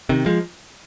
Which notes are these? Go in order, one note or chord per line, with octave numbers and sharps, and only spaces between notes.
C3 D#3
F3 G#3